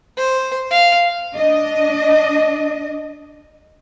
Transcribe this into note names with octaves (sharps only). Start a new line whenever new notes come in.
C5
F5
D4 D#5